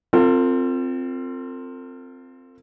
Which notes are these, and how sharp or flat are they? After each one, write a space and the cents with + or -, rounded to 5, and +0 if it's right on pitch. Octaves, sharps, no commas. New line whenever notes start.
C4 +0 F4 +0 A4 +45